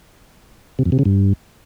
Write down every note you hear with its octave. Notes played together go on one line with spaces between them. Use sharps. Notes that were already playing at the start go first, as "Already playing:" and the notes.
C3
F2
C3
C#3
G2